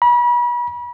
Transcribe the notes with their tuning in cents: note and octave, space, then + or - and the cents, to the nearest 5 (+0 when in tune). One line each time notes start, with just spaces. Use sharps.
B5 -35